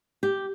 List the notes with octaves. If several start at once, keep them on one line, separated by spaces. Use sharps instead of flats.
G4